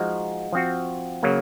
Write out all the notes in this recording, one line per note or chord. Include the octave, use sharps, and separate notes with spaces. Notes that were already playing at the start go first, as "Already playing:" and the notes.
Already playing: F3 G#3 D#4 F#4
F3 C4 F#4
C#3 F#3 A#3